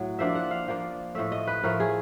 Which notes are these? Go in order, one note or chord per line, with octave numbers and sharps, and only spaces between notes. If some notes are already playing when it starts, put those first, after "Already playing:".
Already playing: A2 F#3
F3 A#3 D4 E5
F#5
F5
F3 A#3 D4
A2 F3 A3 E5
D#5
B4
A2 F3 A3 A#4
G#4